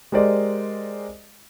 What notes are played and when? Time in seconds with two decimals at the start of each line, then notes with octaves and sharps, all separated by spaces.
0.12 G#3 G4 A#4 C5 D5 D#5